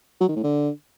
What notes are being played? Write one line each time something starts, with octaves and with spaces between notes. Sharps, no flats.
F#3
D#3
A2
D3